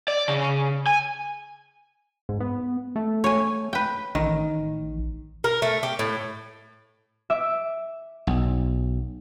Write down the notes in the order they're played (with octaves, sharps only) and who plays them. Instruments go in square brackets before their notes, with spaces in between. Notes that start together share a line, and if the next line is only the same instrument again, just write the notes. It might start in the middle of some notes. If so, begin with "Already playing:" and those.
[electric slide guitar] D5
C#3
G#5
[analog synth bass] G#2
B3
A3
[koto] C#5 G#5
B4 G5
[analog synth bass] A1 [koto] D#3
[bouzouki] A#4
A3
G4
A2
[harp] E5 D6
[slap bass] B1